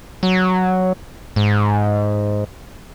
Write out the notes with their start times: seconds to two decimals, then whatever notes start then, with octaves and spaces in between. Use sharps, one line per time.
0.23 F#3
1.36 G#2